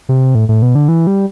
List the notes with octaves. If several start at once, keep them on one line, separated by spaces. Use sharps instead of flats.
C3
A2
A2
B2
D3
E3
G3